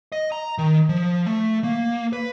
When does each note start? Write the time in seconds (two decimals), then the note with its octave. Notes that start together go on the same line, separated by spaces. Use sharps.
0.12 D#5
0.32 A#5
0.58 D#3
0.89 F3
1.26 A3
1.64 A#3
2.13 B4